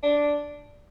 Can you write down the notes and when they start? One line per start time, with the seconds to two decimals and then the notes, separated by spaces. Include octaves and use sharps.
0.03 D4